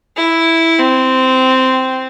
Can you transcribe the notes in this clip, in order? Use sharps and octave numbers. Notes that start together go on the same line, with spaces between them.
E4
C4